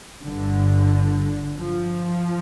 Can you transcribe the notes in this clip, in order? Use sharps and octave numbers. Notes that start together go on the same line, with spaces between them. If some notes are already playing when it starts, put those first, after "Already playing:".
G1 G2 D3
F3